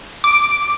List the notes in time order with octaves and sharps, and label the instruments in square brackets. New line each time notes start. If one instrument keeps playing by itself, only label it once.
[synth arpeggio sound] D6